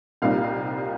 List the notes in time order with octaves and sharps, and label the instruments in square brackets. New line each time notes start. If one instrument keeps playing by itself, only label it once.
[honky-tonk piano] C2 A#2 G3 C4 D#4 F5